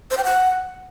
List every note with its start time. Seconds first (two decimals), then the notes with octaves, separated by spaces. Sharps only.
0.11 C5
0.17 G5
0.24 F#5